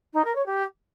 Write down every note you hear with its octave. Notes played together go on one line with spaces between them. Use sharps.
D#4
A#4
C#5
G4